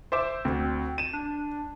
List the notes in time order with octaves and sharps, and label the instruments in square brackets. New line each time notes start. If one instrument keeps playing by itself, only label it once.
[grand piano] C5 E5 D6
[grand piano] D2 [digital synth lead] C4
[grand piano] D#7 E7
[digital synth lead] D4